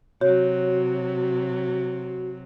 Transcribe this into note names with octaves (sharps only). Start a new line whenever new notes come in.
C3 F#3 F#4 C#5